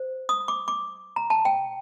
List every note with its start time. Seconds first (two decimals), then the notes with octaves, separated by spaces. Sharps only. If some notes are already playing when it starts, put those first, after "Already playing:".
Already playing: C5
0.29 D#6
0.48 D6
0.68 D6
1.16 A#5
1.30 A5
1.45 G5